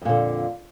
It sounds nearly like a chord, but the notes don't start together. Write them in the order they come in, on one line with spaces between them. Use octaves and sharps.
F2 A#2 D3